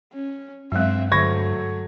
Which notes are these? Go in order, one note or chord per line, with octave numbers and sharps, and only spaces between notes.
C#4
G2 F#3 G#3 C4 E5
D3 F#3 A3 C#6 G#6 A#6